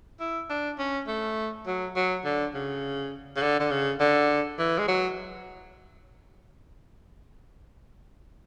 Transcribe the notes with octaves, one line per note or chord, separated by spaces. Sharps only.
E4
D4
C#4
A3
F#3
F#3
D3
C#3
C#3
D3
D3
C#3
D3
E3
G#3
F#3